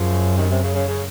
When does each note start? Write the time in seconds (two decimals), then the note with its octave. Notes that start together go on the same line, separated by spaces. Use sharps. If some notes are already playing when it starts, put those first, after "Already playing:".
Already playing: F#2 C#3 F3
0.36 C3 D#3
0.49 C3
0.62 C#3
0.75 C#3
0.87 C#3